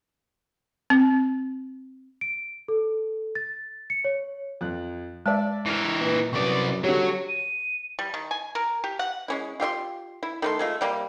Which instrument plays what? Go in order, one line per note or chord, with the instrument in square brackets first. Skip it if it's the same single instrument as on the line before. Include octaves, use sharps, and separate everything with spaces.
[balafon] C4
[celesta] D7
A4
A6
C#7
C#5
[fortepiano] F2 F#6
[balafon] G#3 [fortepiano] D5 E5 A5
[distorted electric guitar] E3 A#4
[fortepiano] A#2 [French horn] B4
[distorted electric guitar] C2 D5 [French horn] F#2 [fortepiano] B4 C#6
[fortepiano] D3 G3 [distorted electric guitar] F#3 [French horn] C#5
[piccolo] D#7
[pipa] G3
D#3
G#5
A#4
G4
F#5
G#3 C#4 E4
F4 G4 E5 C6
E4
D#3 A3 C6
G#3 A3 F4
C3 G3 A#3